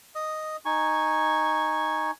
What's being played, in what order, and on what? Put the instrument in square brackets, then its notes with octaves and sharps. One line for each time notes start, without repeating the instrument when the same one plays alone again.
[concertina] D#5 D#6
D#4 G#5 C#6